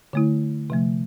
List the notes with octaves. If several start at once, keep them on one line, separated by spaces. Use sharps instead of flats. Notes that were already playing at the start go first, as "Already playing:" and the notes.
D3 A3 E4
C3 F3 A3